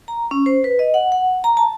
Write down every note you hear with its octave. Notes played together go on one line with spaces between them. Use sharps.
A#5
C#4
C5
B4
D#5
F#5
F#5
A#5
A5